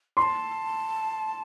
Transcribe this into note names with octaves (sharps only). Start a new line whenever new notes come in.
B5 C6
A5